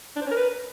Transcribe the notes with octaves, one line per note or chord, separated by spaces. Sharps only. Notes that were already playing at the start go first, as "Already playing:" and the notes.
D4
C5
C#4
A#4
B4